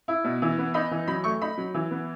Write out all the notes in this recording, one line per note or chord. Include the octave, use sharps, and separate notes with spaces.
E4
B2
E3
B3
D#4 B5
E3
F#3 B5
A3 C#6
D#4 B5
F#3
E3
B3